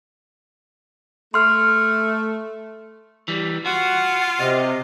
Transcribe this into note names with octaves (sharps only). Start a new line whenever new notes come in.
A3 C6 F6
E3 G3
F4 F#4 F#5
C3 D#5